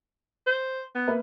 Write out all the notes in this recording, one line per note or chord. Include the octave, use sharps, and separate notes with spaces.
C5
B3
A#3 B4 E5